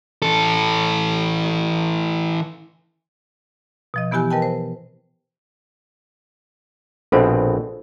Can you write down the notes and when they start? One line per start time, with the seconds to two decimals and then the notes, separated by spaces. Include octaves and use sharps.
0.22 E3 A4
3.94 B2 F3 D#5
4.11 E3 B3 E4 G4 G#5 F#6
4.31 A#4 B4 D#5 G5 A5
4.42 C5
7.12 A#1 B2 C4 F4 A4 C5